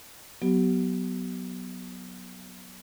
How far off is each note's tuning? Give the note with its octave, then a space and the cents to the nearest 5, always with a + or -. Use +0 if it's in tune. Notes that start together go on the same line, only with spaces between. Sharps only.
F#3 +0 B3 +0 G4 -35